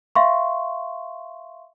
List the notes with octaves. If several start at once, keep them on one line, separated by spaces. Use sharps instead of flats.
E5 F5 C6 C#6